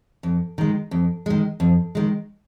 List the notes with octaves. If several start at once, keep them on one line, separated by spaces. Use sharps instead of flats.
F2
D#3 G#3
F2
D#3 G#3
F2
D#3 G#3